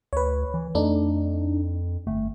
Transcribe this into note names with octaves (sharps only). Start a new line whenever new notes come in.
D2 B4 C#5
E3
F2 A3 D4 D#4
G1 A3